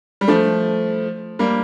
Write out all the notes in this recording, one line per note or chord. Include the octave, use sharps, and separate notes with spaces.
G3
F3 A3
G3 A#3